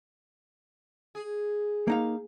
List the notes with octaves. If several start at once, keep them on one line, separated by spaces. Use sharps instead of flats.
G#4
A#3 D#4 F5